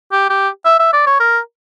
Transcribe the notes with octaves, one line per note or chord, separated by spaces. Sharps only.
G4
G4
E5
E5
D5
C#5
A#4